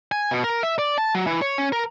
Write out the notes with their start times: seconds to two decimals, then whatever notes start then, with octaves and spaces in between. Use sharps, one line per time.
0.12 G#5
0.31 B2
0.44 A#4
0.63 E5
0.79 D5
0.98 A5
1.15 F#3
1.27 E3
1.42 C#5
1.58 C#4
1.72 A#4